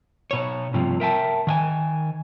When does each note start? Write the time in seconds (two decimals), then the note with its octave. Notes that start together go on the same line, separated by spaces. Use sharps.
0.31 B2 C#5
0.74 G2 C3 F3
1.00 A#4 E5 G5 A5
1.47 D#3 E5 G#5